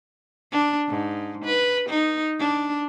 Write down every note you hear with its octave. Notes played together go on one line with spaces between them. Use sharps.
D4
G#2
B4
D#4
D4